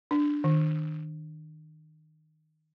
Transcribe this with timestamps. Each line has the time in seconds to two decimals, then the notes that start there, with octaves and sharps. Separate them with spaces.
0.11 D4
0.44 D#3